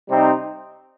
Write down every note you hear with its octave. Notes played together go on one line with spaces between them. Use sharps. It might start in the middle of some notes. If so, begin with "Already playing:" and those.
C3 G3 C4 D#4